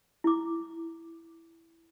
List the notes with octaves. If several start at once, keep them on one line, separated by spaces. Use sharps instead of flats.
E4 D6